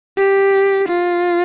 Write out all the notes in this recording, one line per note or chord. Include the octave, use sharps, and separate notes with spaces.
G4
F4